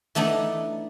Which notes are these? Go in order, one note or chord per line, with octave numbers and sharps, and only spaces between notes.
E3 A3 B3 D4 D#4